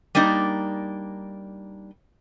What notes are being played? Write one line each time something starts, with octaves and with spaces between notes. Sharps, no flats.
G3 A#3 D4 D#4